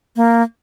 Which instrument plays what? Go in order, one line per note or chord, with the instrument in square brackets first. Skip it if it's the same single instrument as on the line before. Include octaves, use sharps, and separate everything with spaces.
[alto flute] A#3